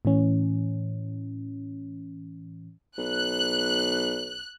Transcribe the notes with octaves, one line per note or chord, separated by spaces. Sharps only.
A2 E3 C#4
B1 F#6